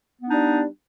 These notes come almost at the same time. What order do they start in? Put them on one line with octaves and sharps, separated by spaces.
B3 D4 D#4 G3